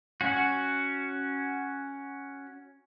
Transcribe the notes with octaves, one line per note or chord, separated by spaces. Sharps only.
C#4 F#4